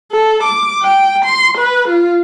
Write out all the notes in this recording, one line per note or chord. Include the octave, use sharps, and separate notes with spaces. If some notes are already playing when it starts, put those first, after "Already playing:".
A4
D6
G5
C6
B4
F4